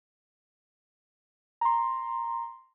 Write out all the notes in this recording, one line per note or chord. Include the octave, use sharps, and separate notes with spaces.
A#5 C6